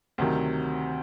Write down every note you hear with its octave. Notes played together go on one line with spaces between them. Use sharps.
D2 C3 D#3 F#3